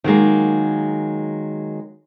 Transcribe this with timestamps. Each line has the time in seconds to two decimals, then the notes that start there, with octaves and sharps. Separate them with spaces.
0.04 D#3 F#3 G#3 A#3